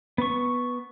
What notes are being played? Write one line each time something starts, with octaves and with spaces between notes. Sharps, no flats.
B3 C#6